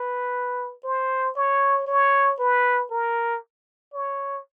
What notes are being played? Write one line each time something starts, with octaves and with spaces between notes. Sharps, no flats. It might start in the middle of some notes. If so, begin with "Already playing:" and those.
Already playing: B4
C5
C#5
C#5
B4
A#4
C#5